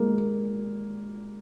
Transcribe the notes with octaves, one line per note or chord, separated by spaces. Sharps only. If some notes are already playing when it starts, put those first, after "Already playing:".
Already playing: G#3 A#3